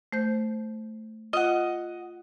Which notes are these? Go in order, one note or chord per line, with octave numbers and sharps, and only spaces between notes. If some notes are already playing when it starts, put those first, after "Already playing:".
A3 C5 G6
F4 D#5 F#5